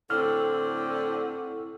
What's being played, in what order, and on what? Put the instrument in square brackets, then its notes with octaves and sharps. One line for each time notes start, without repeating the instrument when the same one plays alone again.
[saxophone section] A2 D3 C4 [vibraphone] E4 C#6 [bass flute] A4 [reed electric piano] F6